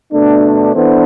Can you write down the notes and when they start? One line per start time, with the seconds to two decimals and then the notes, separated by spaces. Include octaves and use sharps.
0.12 B2 A3 D4
0.75 E3 B3 D4 A4 C5